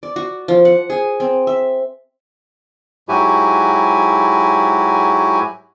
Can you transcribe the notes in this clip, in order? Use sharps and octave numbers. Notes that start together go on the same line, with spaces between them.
D5
F#4
F3
F#5
G#4
C4
E5
G#2 F#3 E4 F#4 G4 G#5